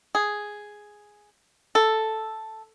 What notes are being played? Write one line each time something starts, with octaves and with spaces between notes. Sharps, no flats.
G#4
A4